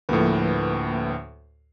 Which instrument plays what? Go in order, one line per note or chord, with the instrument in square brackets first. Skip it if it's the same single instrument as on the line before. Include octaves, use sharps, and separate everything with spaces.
[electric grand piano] D2 A2 [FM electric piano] F3 A#3 B4